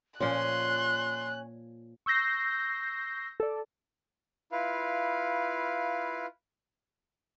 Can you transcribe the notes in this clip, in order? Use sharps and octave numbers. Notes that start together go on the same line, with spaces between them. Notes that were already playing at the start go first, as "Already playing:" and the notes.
A#2 F3 C#4 C6 F#6
C#6 E6 G6 A#6 C7
A4 D5
E4 F4 B4 F5